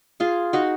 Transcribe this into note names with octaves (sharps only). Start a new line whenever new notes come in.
F4 G#4
D#4 F#4